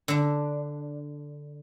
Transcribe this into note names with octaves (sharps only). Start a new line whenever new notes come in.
D3 D4